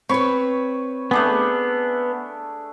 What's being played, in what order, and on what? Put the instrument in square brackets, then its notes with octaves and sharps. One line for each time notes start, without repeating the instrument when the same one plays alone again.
[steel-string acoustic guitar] C4 B4 [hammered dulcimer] C#5 B5 C#6
[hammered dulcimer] A3 D4 G#4 [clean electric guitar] B3